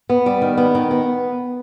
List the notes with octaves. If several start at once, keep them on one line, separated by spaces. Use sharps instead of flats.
B3
G3
D#3
B3
D#3
B3